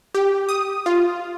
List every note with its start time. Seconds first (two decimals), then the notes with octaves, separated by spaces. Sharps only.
0.15 G4
0.49 D#6
0.86 F4